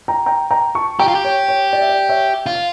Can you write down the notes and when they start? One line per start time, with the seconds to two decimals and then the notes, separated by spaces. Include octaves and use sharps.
0.08 G5 A#5
0.26 G5 A#5
0.51 G5 A#5
0.75 A5 C#6
0.99 G4 G5 A#5
1.08 F4
1.15 G4
1.24 C#5
1.48 C#5
1.73 D5
1.81 E5
1.89 D5
2.09 C#5 E5
2.46 F4
2.55 F5